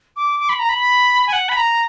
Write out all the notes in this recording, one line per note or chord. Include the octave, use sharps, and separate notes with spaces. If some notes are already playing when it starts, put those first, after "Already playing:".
D6
D6
B5
A#5
B5
G#5
F#5
B5
A#5